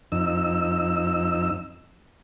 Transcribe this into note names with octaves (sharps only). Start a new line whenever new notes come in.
F2 D#4 E6